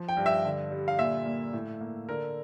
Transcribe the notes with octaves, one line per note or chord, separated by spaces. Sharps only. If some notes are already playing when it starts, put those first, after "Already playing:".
Already playing: F3
G5
G2
E5
D3
G3
F5
A#2 E5
A#3
A2
A#3
D3 A#4